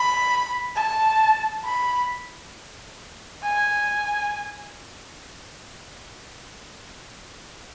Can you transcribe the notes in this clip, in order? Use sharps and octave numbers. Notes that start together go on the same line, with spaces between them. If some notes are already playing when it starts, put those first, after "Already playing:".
Already playing: B5
A5
B5
G#5